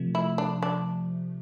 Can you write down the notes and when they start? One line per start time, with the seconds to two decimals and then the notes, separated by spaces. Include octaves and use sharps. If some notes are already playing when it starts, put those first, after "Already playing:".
Already playing: C3 F3 A3
0.15 E4
0.38 D4
0.63 D4